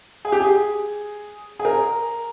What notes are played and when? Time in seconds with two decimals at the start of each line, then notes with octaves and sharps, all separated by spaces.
0.25 G#4
0.32 G4
0.40 G#4
1.59 G#4
1.65 A#4